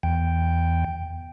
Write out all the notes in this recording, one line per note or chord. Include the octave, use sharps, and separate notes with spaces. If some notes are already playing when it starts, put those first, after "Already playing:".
E2 G5